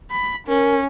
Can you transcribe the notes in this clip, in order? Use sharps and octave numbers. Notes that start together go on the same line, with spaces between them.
B5
C#4 A#4